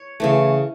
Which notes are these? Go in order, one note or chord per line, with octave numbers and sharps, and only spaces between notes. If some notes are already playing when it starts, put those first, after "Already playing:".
Already playing: C#5
C#3 E3 A3